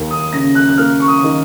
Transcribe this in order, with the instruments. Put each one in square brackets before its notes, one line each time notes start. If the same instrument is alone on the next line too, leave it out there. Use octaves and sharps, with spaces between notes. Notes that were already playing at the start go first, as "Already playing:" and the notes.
Already playing: [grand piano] D#2
D#6
C#3 A#6
F#6
F#6
A#3 F6
C#6
D#6
D#3